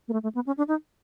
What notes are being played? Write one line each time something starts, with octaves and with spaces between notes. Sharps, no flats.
A#3
A3
A3
B3
C#4
D4
D#4